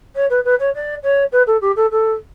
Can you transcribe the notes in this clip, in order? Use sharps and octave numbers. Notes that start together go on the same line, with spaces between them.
C#5
B4
B4
C#5
D5
C#5
B4
A4
G4
A4
A4